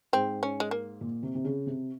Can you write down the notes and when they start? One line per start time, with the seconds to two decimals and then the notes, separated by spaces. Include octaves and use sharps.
0.13 G#2 C4
0.43 C#4
0.60 G#3
0.71 A#3
1.01 A#2
1.23 C3
1.35 C3
1.44 C#3
1.66 C3